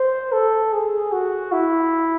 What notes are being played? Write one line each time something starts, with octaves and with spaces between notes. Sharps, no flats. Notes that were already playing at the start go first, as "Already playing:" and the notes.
Already playing: C5
A4
G#4
F#4
E4